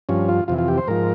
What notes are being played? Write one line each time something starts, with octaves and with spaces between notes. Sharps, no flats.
G2 F3 C#4
F4
F2 C3 E3 F4
F4
G4
C5
G#2 F3 A#4